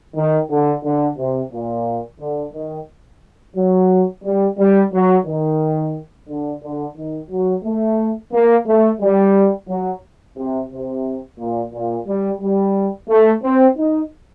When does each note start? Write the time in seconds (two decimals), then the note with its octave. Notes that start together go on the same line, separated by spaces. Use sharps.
0.16 D#3
0.50 D3
0.84 D3
1.18 C3
1.52 A#2
2.20 D3
2.54 D#3
3.56 F#3
4.24 G3
4.58 G3
4.93 F#3
5.26 D#3
6.29 D3
6.63 D3
6.97 D#3
7.31 F#3
7.64 A3
8.33 A#3
8.67 A3
9.01 G3
9.69 F#3
10.37 C3
10.71 C3
11.39 A#2
11.73 A#2
12.07 G3
12.41 G3
13.09 A3
13.43 C4
13.77 D#4